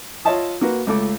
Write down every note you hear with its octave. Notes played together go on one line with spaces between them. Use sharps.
F4 C#5 D#5 E5 A5 D#6
A#3 F#4 B4
C#2 A3 A4 D6